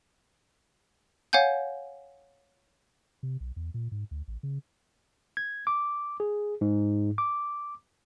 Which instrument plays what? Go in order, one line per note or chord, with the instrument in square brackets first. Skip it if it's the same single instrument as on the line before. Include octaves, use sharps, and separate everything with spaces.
[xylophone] C#5 F5 F#5 G#5 G6
[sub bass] C3
B1
E2
A#2
G#2
D2
A1
C#3
[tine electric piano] G#6
D6
G#4
G#2
D6